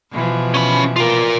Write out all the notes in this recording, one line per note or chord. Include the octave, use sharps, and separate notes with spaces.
B2 E3 F3
C#4 B5
F4 A#4